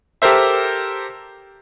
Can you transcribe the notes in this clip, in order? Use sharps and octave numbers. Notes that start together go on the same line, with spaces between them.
G4 A4 A#4 C5 E5